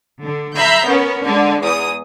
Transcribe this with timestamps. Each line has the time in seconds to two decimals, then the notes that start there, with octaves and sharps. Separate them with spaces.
0.21 D3
0.55 E5 A#5 B5 G6 C7
0.87 B3 C#4 A#4
1.24 D3 G#3
1.62 E2 D#6